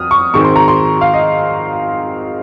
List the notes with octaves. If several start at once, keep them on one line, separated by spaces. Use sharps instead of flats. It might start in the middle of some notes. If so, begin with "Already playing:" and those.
Already playing: F2 D#6 F6
C#6
G#2 D#3 G#3 C4 C#6
C6
A#5
C6
F5
D#5